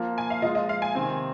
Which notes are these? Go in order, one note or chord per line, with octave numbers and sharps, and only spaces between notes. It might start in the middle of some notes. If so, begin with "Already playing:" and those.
Already playing: F3 A#3 F4
G#5
F5
F3 G#3 F4 D#5
D#5
F5
G#5
C3 D#3 C4